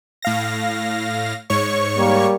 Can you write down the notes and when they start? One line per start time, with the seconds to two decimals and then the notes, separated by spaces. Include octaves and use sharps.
0.22 A2 F5 A#6
1.50 G#2 C#5 C#6
1.97 G3 A#3